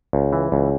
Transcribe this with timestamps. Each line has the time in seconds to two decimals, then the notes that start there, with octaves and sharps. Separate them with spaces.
0.13 C#2
0.33 E3
0.52 C#2